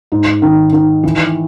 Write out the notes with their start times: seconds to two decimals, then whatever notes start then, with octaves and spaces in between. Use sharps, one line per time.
0.12 G#2
0.42 D#3
0.73 D#3
1.03 E3